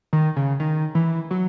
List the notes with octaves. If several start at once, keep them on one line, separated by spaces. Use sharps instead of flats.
D#3
C#3
D#3
E3
F#3